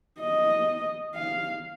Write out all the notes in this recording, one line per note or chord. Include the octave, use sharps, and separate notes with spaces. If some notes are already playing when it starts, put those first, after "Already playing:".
D#5
F5